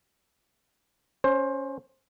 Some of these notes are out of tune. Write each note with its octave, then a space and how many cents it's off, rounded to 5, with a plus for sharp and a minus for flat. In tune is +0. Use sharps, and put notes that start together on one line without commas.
C#4 +5 C5 +20